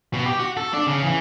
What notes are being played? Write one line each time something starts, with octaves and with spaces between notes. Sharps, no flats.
B2
G4
F#4
A4
D4
C#3
E3